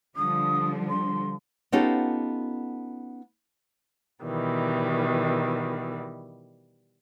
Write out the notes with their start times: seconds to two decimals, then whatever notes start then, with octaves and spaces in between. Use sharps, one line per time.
0.15 D3 F3 G3 D#6
0.89 C6
1.72 B3 C#4 D#4 F4 G4 A4
4.24 B2 D#3 E3 G3